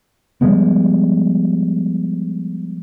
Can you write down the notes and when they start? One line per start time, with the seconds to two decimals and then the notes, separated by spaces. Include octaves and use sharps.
0.41 F3 G3 G#3 B3